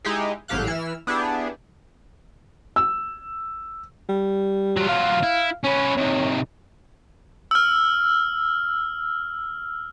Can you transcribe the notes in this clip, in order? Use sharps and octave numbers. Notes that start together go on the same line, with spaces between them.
G#3 D#4 E4 G4 G#4
G#1 A2 F#3 G4 F5 F#6
E3 E4 E6 F6
B3 D4 E4 G4 G#4
E6
G3
F#3 F4
F5
E4
C#4 B4 C#5
C3 D#3
E6 F6